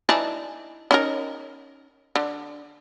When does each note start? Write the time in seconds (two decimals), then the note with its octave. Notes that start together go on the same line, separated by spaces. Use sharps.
0.09 E3 D4 D#4
0.91 C#4 D#4 A#4
2.16 D3